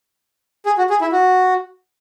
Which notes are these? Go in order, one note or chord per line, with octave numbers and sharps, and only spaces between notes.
G#4
F#4
G#4
E4
F#4